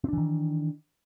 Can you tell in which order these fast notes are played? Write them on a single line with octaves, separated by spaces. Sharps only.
C4 D4 E3 D#3